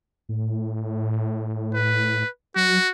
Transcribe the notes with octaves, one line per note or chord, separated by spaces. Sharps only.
A2
B4
F#3 F#4